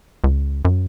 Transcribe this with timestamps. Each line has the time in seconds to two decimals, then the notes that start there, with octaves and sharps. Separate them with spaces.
0.24 C#2
0.65 F#2